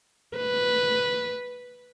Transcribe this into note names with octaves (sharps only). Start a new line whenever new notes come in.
B4